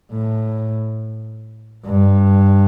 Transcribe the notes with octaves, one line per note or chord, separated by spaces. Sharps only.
A2
G2